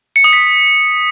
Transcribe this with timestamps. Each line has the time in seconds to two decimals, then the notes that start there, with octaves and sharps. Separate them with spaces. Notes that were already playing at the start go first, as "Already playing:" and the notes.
0.16 C#7
0.24 D#6
0.33 B6